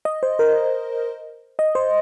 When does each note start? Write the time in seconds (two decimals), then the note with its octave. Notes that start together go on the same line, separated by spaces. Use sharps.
0.05 D#5
0.23 C5
0.39 A#4
1.59 D#5
1.75 C5